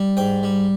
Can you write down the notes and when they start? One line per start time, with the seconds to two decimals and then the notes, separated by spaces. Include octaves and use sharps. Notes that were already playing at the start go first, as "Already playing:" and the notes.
Already playing: G3
0.17 G#2 G5
0.43 G3